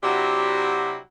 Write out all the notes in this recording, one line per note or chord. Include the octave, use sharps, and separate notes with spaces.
C3 F#3 D4 E4 F#4 G4